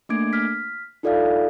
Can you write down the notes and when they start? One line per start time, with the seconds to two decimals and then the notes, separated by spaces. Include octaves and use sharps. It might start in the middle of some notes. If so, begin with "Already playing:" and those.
0.09 A3 A#3 D4 D6 G#6 D7
0.33 F6 B6
1.03 D#4 F4 A4 D5 E5 F5